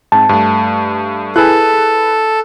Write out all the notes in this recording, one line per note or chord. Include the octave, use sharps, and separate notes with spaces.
G#2 C4 A5
G2 A3
E4 G#4 A4 B4 F#6